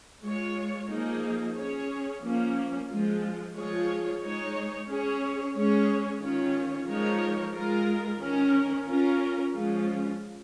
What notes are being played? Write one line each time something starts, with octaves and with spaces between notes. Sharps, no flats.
G#3 F4 C#5
F3 A#3 D#4 G#4
C#4 G#4 C#5
F3 A#3 C#4
F3 G#3 F4
F3 G#3 F4 G#4 C#5
G#3 D#4 C#5
C#4 G#4 C#5
G#3 C#4 G#4 C#5
D#3 C#4 F4 C#5
F3 G#3 D#4 A#4 C#5
G#3 F4 A#4
D#3 C#4 A#4
C#4 F4 A#4
F3 G#3 C#4 F4